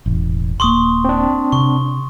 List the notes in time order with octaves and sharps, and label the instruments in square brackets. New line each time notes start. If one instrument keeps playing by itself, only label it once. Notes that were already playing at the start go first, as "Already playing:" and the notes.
[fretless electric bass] E1 A1
[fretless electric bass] D#1 A#3 [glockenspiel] C6 C#6 D#6
[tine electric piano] C4 D4
[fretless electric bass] C3 [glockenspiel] C#6